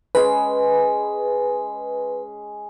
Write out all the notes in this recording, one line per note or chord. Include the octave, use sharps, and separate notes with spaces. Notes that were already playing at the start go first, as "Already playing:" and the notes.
G#3 C#4 G#4 B4